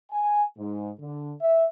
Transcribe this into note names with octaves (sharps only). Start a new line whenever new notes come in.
G#5
G#2
D3
E5